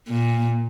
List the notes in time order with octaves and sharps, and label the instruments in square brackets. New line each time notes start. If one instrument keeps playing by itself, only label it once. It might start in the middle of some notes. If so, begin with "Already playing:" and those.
[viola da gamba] A#2